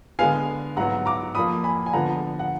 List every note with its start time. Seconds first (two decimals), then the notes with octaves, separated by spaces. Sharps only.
0.19 D3 G#3 B3 F5 G#5
0.76 G#2 F#3 B3 F#5 A#5
1.06 A#5 D6
1.35 F2 F3 A#3 B5 D#6
1.64 G#5 B5
1.86 G#5
1.93 D3 F3 G#3 B3 F#5 A#5
2.39 F#5